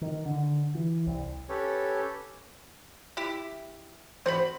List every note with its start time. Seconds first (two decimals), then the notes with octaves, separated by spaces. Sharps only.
0.01 D#3
0.26 D3
0.75 E3
1.07 C2
1.49 C#4 G4 A4 B4 C#5
3.17 E4 G4
4.26 C4 F#4 C5 B5